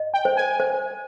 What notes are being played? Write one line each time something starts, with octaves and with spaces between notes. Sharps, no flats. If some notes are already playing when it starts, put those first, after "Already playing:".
Already playing: D#5
G5
C5
G#5
C5